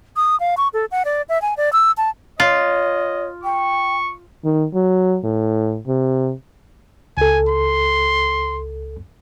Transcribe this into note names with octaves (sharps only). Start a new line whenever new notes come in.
D#6
F5
C#6
A4
F#5
D5
E5
G#5
D5
E6
A5
F4 C#5 D#5
G5 C#6
D#3
F#3
A2
C3
C#2 A4 G#5
C6